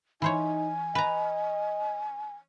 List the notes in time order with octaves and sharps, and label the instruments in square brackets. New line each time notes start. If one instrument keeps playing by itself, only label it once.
[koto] E3 C5 C#5 [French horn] D#4 [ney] G#5
[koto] B4 A#5 [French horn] D#5